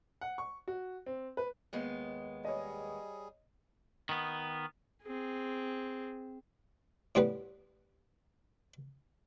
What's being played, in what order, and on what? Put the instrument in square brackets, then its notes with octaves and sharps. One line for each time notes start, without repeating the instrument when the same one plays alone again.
[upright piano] F#5
C#6
F#4
C4
B4
[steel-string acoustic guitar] D#2 G#3 B3
[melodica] G3 G#4 [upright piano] C#5 D#5
[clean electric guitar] D#3 B3
[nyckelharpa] C4 G#4
[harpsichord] A2 G3 B3 B4